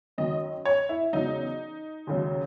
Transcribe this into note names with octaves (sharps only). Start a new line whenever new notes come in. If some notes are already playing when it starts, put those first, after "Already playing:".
F#2 D#3 F#3 D#5
C#5
E4
E2 C#3 F#3 D#4
D#2 C#3 F#3